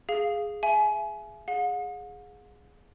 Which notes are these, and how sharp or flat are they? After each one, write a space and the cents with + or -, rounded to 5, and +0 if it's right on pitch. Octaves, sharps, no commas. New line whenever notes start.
G#4 +0 F5 +0
E5 +35 G#5 +30
G#4 +0 F#5 -45